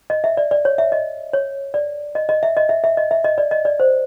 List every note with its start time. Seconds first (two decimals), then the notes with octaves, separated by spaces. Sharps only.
0.10 D#5
0.24 E5
0.37 D5
0.51 D5
0.65 C#5
0.78 E5
0.92 D#5
1.33 C#5
1.74 D5
2.15 D#5
2.29 D#5
2.43 E5
2.57 D#5
2.69 E5
2.84 E5
2.97 D#5
3.11 E5
3.24 D#5
3.38 D5
3.51 D#5
3.65 D5
3.80 C5